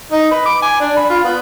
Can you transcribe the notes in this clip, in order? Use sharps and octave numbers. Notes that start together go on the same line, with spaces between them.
D#4
B4
D6
G#5
D4
B5
F4
B3